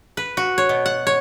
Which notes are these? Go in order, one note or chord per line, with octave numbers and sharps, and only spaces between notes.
B4
F#4
C#5
B2
F#5
C#5